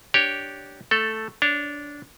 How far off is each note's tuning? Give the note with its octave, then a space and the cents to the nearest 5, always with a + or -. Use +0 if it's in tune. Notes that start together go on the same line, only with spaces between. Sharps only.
D4 +0 G4 -10 C#5 +0
A3 +0 A4 +0
D4 -15 C#5 +0